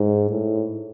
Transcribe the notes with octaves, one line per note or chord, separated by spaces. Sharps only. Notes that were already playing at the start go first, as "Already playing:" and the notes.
Already playing: G#2
A2